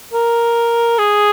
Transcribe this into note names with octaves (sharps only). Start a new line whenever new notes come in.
A#4
G#4